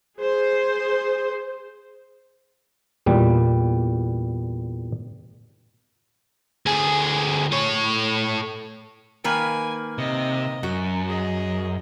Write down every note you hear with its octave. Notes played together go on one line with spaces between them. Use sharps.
G#4 C5
E2 A#2 G3
D2 G#4
A3 C#5
D#3 A#3 B4 G#5
C3 D#5
F#2 F#4
G#4 D#5